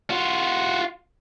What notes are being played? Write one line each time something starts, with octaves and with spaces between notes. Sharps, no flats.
F4 F#4